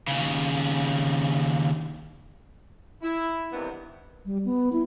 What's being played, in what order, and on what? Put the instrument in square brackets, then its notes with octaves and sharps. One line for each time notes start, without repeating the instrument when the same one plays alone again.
[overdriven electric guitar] D#2 C#3
[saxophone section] E4
G2 C3 D#3 E3 B3 D4
[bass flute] G3
B3
E4